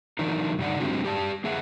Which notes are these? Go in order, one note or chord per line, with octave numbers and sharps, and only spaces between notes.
E3 F#3 D4 D#4 A#4
G2 C#3 D#4 D5 F#5
F#3 G#3 C4 D4 F#4 G4
G4 D5 A5
A#3 G#4 E5 F#5